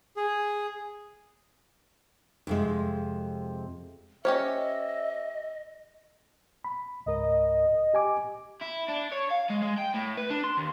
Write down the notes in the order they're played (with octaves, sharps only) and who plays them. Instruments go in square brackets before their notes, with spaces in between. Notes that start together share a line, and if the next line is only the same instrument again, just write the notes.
[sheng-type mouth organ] G#4
[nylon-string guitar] F2 C3 G#3
[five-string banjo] C#4 G4 C#5 [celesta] C5 [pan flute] D#5 [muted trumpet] E5
[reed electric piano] B5
[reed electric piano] C#2 G#2 A#4 [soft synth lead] D#5
[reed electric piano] G4 G#5 D6
[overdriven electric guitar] E4
D4
C#5
F5
G#3
G#3
G5
A2
B4
D4
C6
D#2